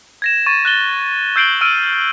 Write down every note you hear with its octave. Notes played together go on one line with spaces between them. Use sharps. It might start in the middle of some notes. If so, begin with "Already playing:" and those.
G#6 A#6 E7
C#6 A6 D#7
F#6 A6 G7
E6 G6 C7 D7 F#7 G7
E6 F6 D7 D#7